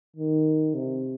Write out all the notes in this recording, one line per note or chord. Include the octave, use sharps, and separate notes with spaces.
D#3
C3